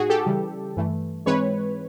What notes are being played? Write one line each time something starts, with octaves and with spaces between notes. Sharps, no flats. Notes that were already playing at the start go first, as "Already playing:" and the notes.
Already playing: A2 D#4 F#4 G#4
G4 A4
C#3 E3 G3
G2 E3 A3
G#2 E3 G#3 C4 B4 C#5